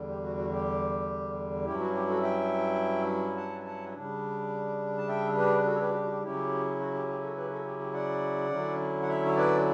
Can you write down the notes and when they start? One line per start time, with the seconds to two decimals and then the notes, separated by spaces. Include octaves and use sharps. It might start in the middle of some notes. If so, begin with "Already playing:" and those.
Already playing: E2 D3 G3
0.09 G4
0.23 F#4
0.36 F#4
0.52 G4
1.65 G2 F#3 C#4 E4 G4
1.80 F#4
1.94 G4
2.08 F#4 A4
2.22 E5 G5
3.36 F#5 A5
3.65 F#5 A5
3.93 C#3 G3 D4
4.98 A5
5.08 E5 G5
5.37 G4 B4
5.65 F#4 A4
5.75 C#5
5.80 G4 B4
5.89 F#4
5.94 G4
6.04 F#4
6.08 G4
6.22 C#3 F#3 C#4 E4 G4
6.79 F#4
6.94 G4
7.08 G4
7.22 F#4 A4
7.36 G4 B4
7.51 F#4 A4
7.65 G4
7.79 G4
7.94 D5 F#5
8.50 D3 F#3 C#4 E4
9.02 F#5
9.08 C#5 E5
9.25 C#5
9.36 B4 D5